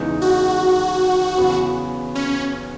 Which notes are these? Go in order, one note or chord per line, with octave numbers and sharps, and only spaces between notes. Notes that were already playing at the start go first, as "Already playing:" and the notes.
Already playing: E2 C#3 G#3 D#4
F#4
E2 C#3 F#3 B3
C#4